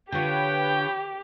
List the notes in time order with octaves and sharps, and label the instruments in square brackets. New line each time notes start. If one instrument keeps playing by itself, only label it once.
[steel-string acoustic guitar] D3 F4 [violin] G4 [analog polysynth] B4 C#5 [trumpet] G5